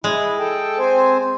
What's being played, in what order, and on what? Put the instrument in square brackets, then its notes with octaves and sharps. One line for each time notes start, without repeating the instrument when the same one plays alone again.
[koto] G#3 [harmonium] E4
[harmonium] A4 G5 A5
C4 C5 G#5